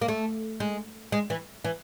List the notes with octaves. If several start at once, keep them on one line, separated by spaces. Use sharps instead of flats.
A#3
A3
G#3
G#3
E3
E3